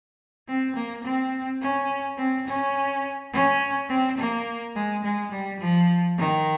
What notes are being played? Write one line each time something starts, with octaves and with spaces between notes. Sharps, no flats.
C4
A#3
C4
C#4
C4
C#4
C#4
C4
A#3
G#3
G#3
G3
F3
D#3